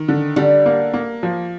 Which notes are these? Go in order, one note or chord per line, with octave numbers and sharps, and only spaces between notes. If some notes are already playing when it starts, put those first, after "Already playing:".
Already playing: D#3
D3
D3 G3
A#3
A#3
F3